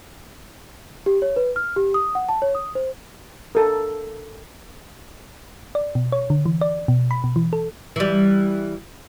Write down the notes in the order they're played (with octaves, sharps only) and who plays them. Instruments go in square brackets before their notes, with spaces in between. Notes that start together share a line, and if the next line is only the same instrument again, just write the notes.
[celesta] G4
C#5
B4
F6
G4
D#6
F#5
A5
C#5
D#6
C5
[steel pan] A4 A#4
[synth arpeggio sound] D5
B2
C#5
D3
E3
D5
B2
B5
B2
E3
A4
[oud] E3 G3